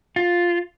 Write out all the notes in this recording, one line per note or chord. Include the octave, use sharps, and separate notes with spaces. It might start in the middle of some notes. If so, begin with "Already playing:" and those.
F4